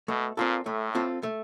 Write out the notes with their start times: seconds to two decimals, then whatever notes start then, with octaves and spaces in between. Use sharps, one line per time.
0.08 B2 A3
0.37 A#2 C4 F4 A4
0.66 A2 A3
0.95 C4 F4 A4
1.23 A3